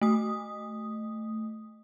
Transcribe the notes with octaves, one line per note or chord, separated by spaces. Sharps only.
A3 D#6